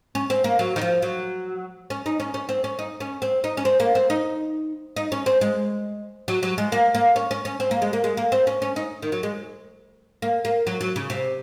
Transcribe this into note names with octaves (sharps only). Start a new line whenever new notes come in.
C#4
C4
A#3
F#3
D#3
F3
F#3
C#4
D#4
C#4
C#4
C4
C#4
D#4
C#4
C4
D#4
C#4
C4
A#3
C4
D#4
D#4
C#4
C4
G#3
F#3
F#3
G#3
A#3
A#3
C#4
C#4
C#4
C4
A#3
G#3
A#3
G#3
A#3
C4
C#4
C#4
D#4
D#3
F#3
G#3
A#3
A#3
F#3
F#3
C#3
C3